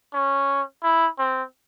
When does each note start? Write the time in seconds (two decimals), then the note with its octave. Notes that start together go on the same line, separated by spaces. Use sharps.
0.13 C#4
0.83 E4
1.18 C4